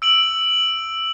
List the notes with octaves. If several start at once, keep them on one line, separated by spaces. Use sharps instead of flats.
E6 D7 F#7